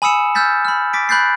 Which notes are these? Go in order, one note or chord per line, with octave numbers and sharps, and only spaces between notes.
G#5 B5 D#6 E6 C#7 E7
E6 F6 G6 A6 B6
B5 F6
D6 A6 B6 D7
B5 F#6 G6 A6 C7